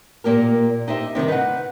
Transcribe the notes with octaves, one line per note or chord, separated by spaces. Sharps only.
A#2 A#3 G4 A#4
D#4 G4 C5 E5
C3 D#3 G3 D#4
B4 F#5